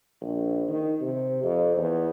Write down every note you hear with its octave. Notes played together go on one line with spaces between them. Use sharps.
A#1
D#3
C3
F2
E2